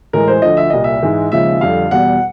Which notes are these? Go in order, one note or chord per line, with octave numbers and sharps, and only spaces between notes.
A2 E3 G#3 A#4
C5
D2 D3 F3 D#5
E5
C2 A#2 G3 D#5
E5
G#2 E3 G#3
D#2 C#3 F3 G#3 E5
F2 D3 G3 F5
E2 B2 G3 F#5